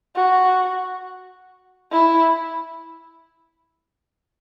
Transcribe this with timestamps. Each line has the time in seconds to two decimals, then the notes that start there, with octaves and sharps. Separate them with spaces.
0.16 F#4
1.92 E4